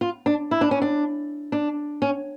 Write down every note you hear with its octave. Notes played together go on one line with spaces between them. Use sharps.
F4
D4
E4
D4
C#4
D4
D4
C#4